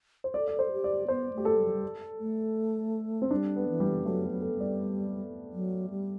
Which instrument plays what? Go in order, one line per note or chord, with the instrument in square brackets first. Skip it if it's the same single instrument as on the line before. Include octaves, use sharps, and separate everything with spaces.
[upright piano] C5
[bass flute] A4 [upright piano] D5
[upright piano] D5
C5
[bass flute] G4
[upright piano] D5
[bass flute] B3 [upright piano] C5
[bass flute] A3 [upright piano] G4
[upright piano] A4
[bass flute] G3
F#3
G3
A3
[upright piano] C4
[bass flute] G3 [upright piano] D4
[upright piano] B3
[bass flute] E3
[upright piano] G3
[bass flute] F#3 [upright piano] A3
[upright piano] B3
[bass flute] F#3
[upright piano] A4
[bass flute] G3
[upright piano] D5
[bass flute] F#3
G3